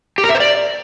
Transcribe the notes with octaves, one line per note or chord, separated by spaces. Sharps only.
G4
A#4
E5
C5
D5